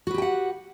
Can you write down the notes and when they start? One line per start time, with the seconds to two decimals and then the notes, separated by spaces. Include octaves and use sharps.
0.07 F#4
0.11 B4
0.14 G4
0.18 G5
0.22 F#5